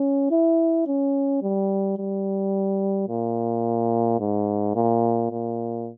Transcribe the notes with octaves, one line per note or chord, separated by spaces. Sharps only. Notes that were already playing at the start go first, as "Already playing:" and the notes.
Already playing: C#4
E4
C#4
G3
G3
A#2
G#2
A#2
A#2